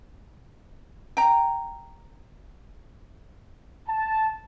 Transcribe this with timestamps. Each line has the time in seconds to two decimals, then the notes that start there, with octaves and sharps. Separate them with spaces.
1.17 G5 A#5
3.87 A5